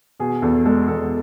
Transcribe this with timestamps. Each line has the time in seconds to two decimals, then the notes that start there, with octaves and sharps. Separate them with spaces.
0.20 B2 G#4
0.42 E2 A4
0.65 G#3 A4
0.88 E2 A4